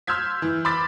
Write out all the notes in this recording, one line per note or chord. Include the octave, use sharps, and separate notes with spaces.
C6 E6 F6 G6 G#6 B6
E3
B5 C6 D6 E6 A6 B6